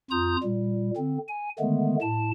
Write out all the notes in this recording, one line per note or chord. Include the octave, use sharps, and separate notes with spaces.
F2 F4 A#5 D#6 G6
A#2 G3
D3 C4
G#5
D3 D#3 G#3 A3 B3
A2 A5